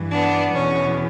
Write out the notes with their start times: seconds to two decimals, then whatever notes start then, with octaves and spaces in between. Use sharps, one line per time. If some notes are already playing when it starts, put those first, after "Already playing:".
Already playing: G2 E3
0.13 B3 D4
0.52 E2 B2 C#4